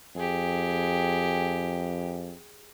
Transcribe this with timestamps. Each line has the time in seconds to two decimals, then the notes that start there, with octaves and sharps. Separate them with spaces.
0.16 F2 G4 G#4